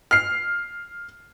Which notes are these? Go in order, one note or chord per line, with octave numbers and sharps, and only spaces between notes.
F6 C7